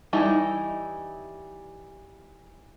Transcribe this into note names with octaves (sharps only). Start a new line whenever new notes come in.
E3 G3 D#4 E4